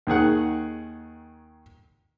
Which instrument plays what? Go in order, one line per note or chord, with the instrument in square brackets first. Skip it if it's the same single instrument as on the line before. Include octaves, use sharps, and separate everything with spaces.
[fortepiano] D#2 D#3 G#4 F#5